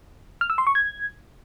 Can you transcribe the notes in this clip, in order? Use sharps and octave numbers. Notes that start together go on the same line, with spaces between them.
F6
E6
C6
C#6
G#6